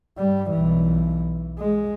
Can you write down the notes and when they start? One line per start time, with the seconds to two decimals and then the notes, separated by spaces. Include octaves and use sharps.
0.18 G2 G3
0.50 B1 E3
1.59 G#3